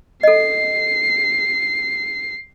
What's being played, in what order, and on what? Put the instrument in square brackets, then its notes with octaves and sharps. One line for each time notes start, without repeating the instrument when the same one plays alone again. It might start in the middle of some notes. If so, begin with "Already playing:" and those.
[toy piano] A4 D#5 [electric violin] C7